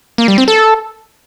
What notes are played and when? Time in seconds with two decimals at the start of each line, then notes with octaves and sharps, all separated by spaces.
0.18 A#3
0.28 G3
0.38 C4
0.48 A4